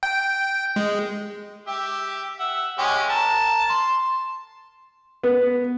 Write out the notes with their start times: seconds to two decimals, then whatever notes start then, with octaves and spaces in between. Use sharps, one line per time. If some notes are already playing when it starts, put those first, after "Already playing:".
0.03 G5
0.76 G#3
1.67 G4 E5
2.39 E5 F#5
2.78 G#3 C#4 G4
3.10 A#4 A5
3.70 C6
5.23 B3